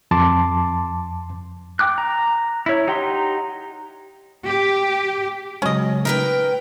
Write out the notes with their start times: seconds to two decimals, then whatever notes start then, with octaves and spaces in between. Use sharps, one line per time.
0.11 F2 A5 C6 D6
1.79 G5 D6 F#6
1.98 A#5
2.66 E4 C#5
2.87 D#4 G4 F#5 A#5 C6
4.44 G4
5.62 C#3 F#3 G#3 C#4 D#5
6.05 D#4 A#4 B4 G5